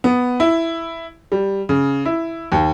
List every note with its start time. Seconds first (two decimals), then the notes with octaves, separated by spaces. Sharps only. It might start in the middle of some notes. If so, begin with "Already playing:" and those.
0.04 B3
0.40 E4
1.32 G3
1.69 C#3
2.05 E4
2.52 D#2